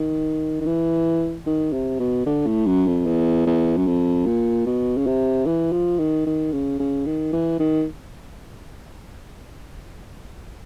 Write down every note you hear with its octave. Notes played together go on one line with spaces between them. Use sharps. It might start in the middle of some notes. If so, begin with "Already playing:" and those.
Already playing: D#3
D#3
E3
D#3
C3
B2
D3
A2
F#2
F2
E2
E2
F#2
F2
A#2
B2
C#3
C3
E3
F3
D#3
D#3
C#3
C#3
D#3
E3
D#3